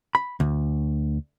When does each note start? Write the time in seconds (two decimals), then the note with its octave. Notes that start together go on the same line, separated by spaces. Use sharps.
0.15 B5
0.40 D2